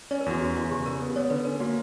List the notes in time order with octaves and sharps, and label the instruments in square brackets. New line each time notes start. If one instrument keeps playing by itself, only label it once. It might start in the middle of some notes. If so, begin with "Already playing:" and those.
[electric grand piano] C#4 [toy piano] C#5
[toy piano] A#4
[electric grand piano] E2 [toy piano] F#4
[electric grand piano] C#4 [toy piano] F#4
[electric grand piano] E2 [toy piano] F#4
[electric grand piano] C#3 [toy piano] G4
[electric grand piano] C#3 [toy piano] A#4
[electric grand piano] B3
[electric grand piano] B3 [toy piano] C#5
[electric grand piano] D3 [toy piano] B4
[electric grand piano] C#4 [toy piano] A#4
[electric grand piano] A#3 [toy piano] F#4